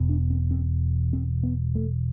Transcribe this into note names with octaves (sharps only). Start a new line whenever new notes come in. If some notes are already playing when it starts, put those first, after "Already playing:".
Already playing: E1 E2 B2
D4
C4
C4
C4
B3
A3